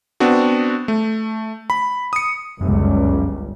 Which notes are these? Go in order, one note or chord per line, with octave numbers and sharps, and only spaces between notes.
B3 C4 D4 F#4
A3
B5
D#6 C#7
G1 C#2 F#2